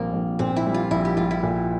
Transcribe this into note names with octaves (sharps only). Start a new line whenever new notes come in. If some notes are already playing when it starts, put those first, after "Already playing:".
Already playing: A#1 A#2 G3 A#3 C4
A#1
A#2 C4
E4
G3
F4
A#1 E4
G4
A#1 F4
E4
A#2